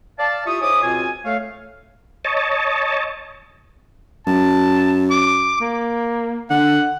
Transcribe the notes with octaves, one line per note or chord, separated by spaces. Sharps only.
D5 F5 A5
E4 F4 G4 E5 C#6 D#6
G#2 C#5 E5 G#5 D6 D#6
C#2 B2 C4 F4 C#5 G#5
A3 C#5 F5
C#5 D#5 A5
F#2 A5
D6
A#3
D3 F#5